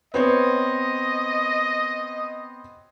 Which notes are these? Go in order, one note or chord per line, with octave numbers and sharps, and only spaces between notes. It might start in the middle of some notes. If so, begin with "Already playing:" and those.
B3 C4 C#5 D#5